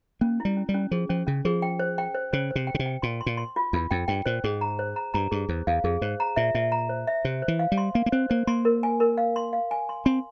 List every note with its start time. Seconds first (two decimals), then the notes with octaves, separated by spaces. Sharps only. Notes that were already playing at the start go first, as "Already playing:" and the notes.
0.21 A#3 C#4
0.40 E4
0.45 G3
0.57 C#4
0.69 G3
0.74 C#4
0.91 F3 G#4
1.09 F3 C#4
1.27 C#3 C#4
1.45 F3 G#4
1.62 G5
1.79 C5
1.98 G5
2.15 C5
2.33 C#3 C5
2.51 C3 C5
2.67 G5
2.75 C#3
2.79 C3
2.86 G5
3.02 A#2 C6
3.21 C6
3.26 A#2
3.37 C6
3.56 F4
3.73 E2 F4
3.91 F2 G5
4.08 G2 G5
4.26 A#2 C5
4.44 G#2 G#4
4.61 A#5
4.79 C5
4.96 A#5
5.14 G2 A#5
5.31 G2 G#4
5.49 E2 C5
5.67 E2 F5
5.84 F2 G#4
6.01 G#2 C5
6.20 A#5
6.36 A#2 E5
6.55 A#2 E5
6.72 A#5
6.89 C5
7.07 E5
7.25 C3 C5
7.42 C5
7.48 E3
7.59 F5
7.72 G3
7.78 C6
7.94 A#3 F5
8.06 A#3
8.12 C4 C5
8.30 A#3 C5
8.47 A#3 C6
8.65 A#4
8.83 G#5
9.00 A#4
9.18 F5
9.36 C6
9.53 F5
9.71 G#5
9.89 C6
10.05 C4 C6